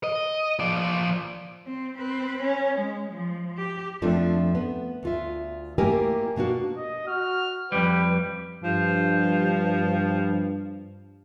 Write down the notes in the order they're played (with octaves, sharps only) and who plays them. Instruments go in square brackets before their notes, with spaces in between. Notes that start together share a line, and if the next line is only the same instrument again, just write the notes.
[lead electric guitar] D#5
F3 D5
[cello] C4
C4 B4
C#4
G#3
F3
G4
[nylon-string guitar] F2 F3 A3 C4 D4
B3
D2 F4 E5
A3 A#3 E4 G4 A#4 G#5
B2 A#3 D4 F#4
[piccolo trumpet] D#5
[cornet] F#4 [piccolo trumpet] F6
[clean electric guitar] F2 G3 [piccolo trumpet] G4 [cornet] B4
[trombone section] G2 [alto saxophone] F3